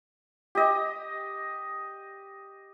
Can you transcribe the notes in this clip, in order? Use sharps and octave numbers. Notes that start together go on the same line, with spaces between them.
G4 D#5